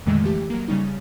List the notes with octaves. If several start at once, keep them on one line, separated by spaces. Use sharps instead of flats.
F2 A#2 D3 D#3 G#3 A3
E3 A3 G4
F#3 A#3
C#3 G3 C#4 D#4